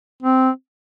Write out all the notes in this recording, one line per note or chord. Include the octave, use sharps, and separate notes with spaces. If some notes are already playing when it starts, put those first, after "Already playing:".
C4